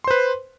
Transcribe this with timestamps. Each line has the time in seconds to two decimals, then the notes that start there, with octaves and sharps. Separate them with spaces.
0.04 C6
0.08 C5
0.11 B4